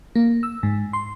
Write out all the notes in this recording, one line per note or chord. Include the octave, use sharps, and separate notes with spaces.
A#3
E6
G#2
C6